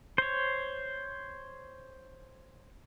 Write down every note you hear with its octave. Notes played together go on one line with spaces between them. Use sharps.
C5 C#5